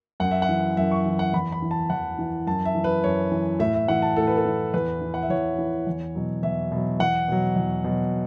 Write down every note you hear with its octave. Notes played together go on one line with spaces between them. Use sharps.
F#2 F#5
E5
F#5
E3
F#2 E5
C#6
E3
F#5
E2 B5
B5
E3
A5
E2 F#5
E3
F#2 A5
E5
E3
B4
F#2 C#5
E3
A2 E5
E5
E3 F#5
A5
A2 A4
B4
A4
E3
E2 B4
E3
F#5
E5
E2 C#5
E3
E2
B2 F#3
E2 E5
B2 F#3
E2 F#5
B2 F#3
E2
B2 F#3